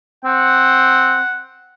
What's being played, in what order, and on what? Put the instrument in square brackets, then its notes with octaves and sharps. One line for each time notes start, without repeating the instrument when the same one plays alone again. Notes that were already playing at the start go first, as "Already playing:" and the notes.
[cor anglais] C4 [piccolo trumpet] F#5